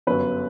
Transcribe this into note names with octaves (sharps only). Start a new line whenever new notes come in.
G1 F#2 F#3 B4